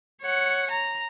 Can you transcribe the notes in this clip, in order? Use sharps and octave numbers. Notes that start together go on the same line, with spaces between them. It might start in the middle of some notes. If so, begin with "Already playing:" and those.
C#5 F#5
A#5